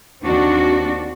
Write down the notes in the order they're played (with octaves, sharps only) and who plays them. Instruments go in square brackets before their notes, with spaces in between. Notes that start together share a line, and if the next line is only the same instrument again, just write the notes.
[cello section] D#2 C4 D4 F#4